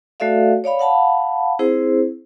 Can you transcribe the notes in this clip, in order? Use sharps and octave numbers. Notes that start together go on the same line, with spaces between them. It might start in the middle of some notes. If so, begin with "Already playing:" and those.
A3 F#4 A4 D5 E5 F5
C#5 D5 F5 B5
F5 F#5 A5 B5
C4 E4 G#4 C5